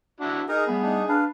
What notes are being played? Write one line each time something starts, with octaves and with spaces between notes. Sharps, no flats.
D4 E4 F#4
D#4 G#4 A#4 A#5
G3 A3 B3 B5
D4 D#4
D4 B4 F5